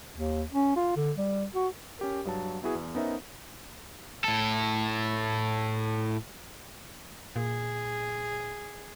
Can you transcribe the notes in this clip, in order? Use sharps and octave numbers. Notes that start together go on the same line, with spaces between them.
D#2
C#4
F4
D3
G3
F#4
C#4 G4 A#4
G2 F#3 A5
B3 E4 F#4 G#4 B4
E2
B3 C#4 D#4 A#4 C5 E5
A2 A4
A#2 G#4